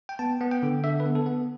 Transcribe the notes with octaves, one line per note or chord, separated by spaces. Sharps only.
G5
B3 A5
B3
G5
D3
D3 E5
B4
B3
A4
B3